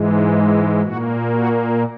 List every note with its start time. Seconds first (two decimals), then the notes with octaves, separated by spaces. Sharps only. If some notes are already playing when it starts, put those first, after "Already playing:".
Already playing: G#2 E3 G#3
0.82 A#2 A#3 F#4
1.33 F#4